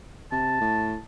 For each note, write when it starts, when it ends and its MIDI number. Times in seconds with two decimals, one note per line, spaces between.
0.32 0.57 48
0.32 1.01 81
0.61 0.96 45